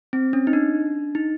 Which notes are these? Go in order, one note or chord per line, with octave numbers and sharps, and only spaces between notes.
C4
C#4
D#4
D4
D#4